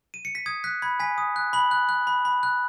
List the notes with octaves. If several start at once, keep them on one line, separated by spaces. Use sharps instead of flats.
D#7
C#7
B6
D#6 G#6
F#6 B6
B5 G#6
G#5 B6
D#6
F#6
B5 F#7
F#6
F#6
B5
B5
F#6